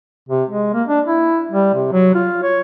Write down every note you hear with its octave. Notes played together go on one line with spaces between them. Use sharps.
C3
G#3
A#3
D4
E4
G3
C3
F#3
F4
C#5